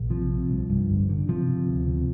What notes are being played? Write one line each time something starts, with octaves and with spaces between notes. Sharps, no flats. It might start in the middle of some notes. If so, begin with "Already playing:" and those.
Already playing: A#1
C3 F3
C3
C2
G2
G1
D3
C3 F3
C3
D2
C3